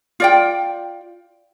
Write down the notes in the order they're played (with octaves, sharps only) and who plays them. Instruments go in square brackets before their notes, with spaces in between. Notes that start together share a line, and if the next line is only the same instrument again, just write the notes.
[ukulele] F4 D5 G5